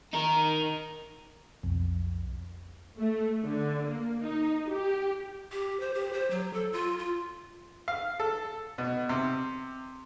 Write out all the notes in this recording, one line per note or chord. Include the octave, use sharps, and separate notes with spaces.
D#4 A#4
B1 F2
A3
D3
A#3
D#4
G4
G4
C5
G4
C5
F#3
A4
F4
F4
F5
A4
B2
C3